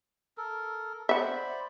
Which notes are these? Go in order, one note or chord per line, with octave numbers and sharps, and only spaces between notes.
A4 A#4
C5 D5 E5 F#5 B5